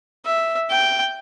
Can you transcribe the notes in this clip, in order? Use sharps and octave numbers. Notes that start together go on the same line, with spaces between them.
E5
G5